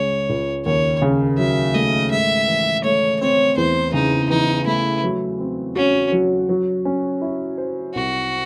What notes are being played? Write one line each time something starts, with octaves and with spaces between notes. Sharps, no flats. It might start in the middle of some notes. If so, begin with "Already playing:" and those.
Already playing: C#2 C#3 G#3 C#5
C#2
D#2 C#5
C#3
F#3 E5
A3 D#5
G#2 E5
E3
A3 C#5
C4 C#5
E2 C5
C#3 D#4
E3 D#4
A3 E4
F#3
C4
C#4 F#4
F#3
F#3
C#4
E4
C5
C2 F#4